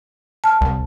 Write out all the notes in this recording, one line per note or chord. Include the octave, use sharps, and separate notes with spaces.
A5 F6
C2